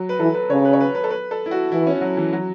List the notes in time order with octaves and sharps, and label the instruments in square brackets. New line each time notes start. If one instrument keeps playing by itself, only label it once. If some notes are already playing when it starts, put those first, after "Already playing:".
Already playing: [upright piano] F#3
B4
[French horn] E3 [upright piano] A4
[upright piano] B4
[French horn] C#3 [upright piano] C#5
[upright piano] B4
C#5
B4
B4
A4
B4
A4
E4
F#4
[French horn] E3 [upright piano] E4
[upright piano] C#4
F#3
E3
F#3